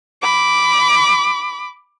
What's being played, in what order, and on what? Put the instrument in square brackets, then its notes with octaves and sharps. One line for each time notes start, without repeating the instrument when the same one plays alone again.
[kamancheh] B5 D6